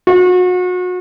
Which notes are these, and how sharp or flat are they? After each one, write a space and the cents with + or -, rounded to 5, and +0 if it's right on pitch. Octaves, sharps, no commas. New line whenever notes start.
F#4 -35